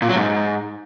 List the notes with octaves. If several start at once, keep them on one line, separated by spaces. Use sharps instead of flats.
A#2
F#3
G#2